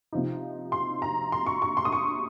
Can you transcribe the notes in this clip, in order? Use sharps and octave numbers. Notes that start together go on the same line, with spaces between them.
C3 F3 C4 D#4
C6
A#5
C6
C#6
C#6
C6
D#6
C#6